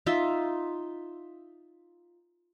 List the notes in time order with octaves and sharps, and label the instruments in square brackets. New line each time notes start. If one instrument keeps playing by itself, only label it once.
[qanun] D#4 F4 E5